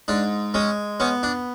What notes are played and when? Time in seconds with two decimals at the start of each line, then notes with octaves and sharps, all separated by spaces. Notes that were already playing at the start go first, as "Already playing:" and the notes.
0.08 G#2 D4
0.54 G#3 C#4
1.00 B3 C#4
1.23 D4